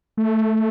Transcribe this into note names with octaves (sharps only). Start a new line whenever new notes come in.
A3